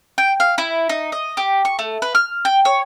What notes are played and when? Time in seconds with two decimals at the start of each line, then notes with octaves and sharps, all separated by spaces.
0.18 G5
0.40 F5
0.58 E4
0.89 D#4
1.12 D#5
1.37 G4
1.65 C#6
1.79 A3
2.02 B4
2.15 F6
2.45 G5
2.65 C#5